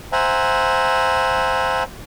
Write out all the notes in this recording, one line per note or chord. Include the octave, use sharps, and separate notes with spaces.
C5 E5 F#5 G#5 A#5